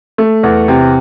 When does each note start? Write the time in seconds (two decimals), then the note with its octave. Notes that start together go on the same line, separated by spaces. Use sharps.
0.18 A3
0.43 E2
0.68 C3